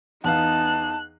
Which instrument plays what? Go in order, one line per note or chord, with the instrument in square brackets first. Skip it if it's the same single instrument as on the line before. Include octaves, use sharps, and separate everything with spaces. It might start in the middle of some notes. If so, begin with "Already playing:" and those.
[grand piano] E2 B3 F5 [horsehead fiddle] D#4 [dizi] A5 [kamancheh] F#6